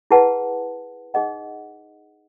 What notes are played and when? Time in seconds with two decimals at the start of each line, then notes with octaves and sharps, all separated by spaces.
0.11 E4 G#4 B4 F#5 A5
1.14 D#4 G#4 D#5 F#5